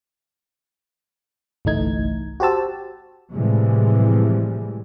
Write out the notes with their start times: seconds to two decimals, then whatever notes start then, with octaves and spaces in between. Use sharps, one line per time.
1.65 G1 C2 E3 A3 D#4 G#6
2.40 F#4 G4 C5 A5 E6
3.32 A2 C3 E3 F3 G3 G#3